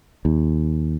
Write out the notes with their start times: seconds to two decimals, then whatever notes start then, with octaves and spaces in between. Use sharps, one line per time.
0.25 D#2